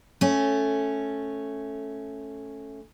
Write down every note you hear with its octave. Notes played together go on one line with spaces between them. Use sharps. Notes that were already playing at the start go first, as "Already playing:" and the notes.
A3 C#4